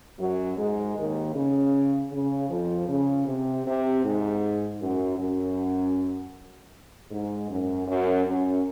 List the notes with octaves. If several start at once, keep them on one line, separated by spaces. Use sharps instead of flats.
F#2 F#3
G#2 G#3
D#2 D#3
C#3
C#3
F2 F3
C#3
C3
C3
G#2
F#2
F#2
G#2
F#2
F#2
F#2